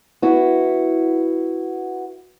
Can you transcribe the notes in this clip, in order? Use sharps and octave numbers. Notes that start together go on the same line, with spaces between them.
B3 E4 F#4